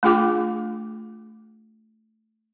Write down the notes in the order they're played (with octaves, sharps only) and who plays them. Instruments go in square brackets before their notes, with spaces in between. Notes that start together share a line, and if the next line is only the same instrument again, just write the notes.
[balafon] A3 D4 F4 G#4 G5 D6